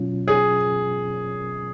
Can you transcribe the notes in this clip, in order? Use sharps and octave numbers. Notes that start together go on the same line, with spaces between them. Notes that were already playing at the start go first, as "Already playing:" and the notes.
Already playing: B2 F#3 C#4 F4
G#4